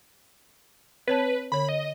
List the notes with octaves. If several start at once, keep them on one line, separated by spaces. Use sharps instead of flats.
C4 B4 C#5 A5
D3 C#5 B5
D#5